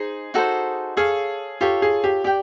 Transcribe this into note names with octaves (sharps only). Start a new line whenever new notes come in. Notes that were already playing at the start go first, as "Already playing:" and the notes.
Already playing: D#4 G#4 C5
D#4 F#4 A4 C5
G#4 A4 C#5 F5
F4 G4 A4 C#5
G#4
G4
G4 D5 G5